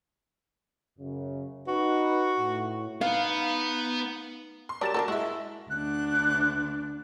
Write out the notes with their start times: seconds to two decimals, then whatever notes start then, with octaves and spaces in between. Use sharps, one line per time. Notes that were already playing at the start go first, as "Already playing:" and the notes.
0.99 F#2 C#3
1.68 D#4 F#4 B4
2.39 A2
3.01 B3 D#4 F5
4.69 C6
4.81 F#3 G3 D4 A#4 A6 E7
4.94 D4 D#4 F#4 A4 A#4
5.08 G#3 E4 F#4 E5
5.70 D2 D4 F#6